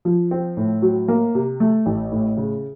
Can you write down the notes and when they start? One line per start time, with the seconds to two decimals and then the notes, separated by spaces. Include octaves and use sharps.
0.05 F3
0.31 C4
0.57 A2
0.82 F#3
1.08 A#3
1.35 C3
1.60 A3
1.86 A1
2.12 A2
2.37 C#3